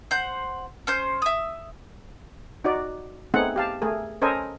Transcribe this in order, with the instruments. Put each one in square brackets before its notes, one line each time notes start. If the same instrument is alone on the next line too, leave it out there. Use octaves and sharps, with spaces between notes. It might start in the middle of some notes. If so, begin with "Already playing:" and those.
[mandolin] C5 F#5 G6
C#4 C5 G6
E5 D#6
[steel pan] D#4 F#4 D5
A3 B3 C4 D#4 G#4 F#5
G4 F5 A5
A3 G#4 A#4
C#4 A4 A#4 C5 D#5 G#5